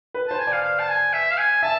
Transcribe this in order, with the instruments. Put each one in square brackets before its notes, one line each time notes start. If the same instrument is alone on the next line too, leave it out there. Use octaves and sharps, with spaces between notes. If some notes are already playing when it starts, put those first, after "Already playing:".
[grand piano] B4
[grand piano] C5 [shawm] A5
[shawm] G#5
[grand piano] D5 [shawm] F5
[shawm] F5
A5
G#5
E5
F5
G#5
[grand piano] E5 [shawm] A5